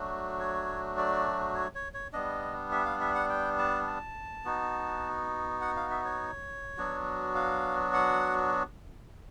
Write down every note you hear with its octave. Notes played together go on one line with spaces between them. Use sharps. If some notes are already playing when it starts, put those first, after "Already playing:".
Already playing: F#3 A3 D4 F#4
C#5
D5
C#5
C#5
C#5
G3 B3 D4 D#5
E5
F5
E5
F#5
G5
A5
A5
B3 D#4 F#4
F#5
F5
E5
C#5
F#3 B3 D4 F#4
F5
F#5